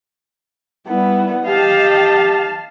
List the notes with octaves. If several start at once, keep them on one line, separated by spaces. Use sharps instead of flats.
G3 B3 E4
G4 D#5 F5 G5 A5